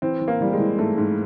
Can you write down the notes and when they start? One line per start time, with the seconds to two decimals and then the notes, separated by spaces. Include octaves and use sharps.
0.02 E3 C4
0.21 E3
0.28 A#3
0.40 E3 G3
0.53 G#3
0.60 E3
0.79 G#2 A3
0.98 G#2